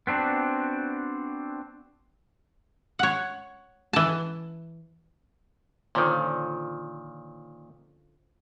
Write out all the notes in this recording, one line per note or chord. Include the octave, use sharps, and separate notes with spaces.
B3 C4 D4 F#4
C#5 F#5
E3 A5
A#2 D3 D#3 F3 C#4